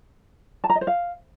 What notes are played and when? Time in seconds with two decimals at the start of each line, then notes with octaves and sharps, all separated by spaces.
0.64 A5
0.70 A#5
0.75 D#5
0.81 C5
0.87 F5